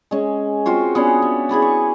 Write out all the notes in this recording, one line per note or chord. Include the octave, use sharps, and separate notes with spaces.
G#3 C#4
C4 F4 F#4 C5
B3 C#4 D4 C#5
E5
E4 G#4 B4 D5
C#6